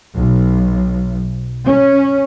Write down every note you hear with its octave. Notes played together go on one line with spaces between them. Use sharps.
B1
C#4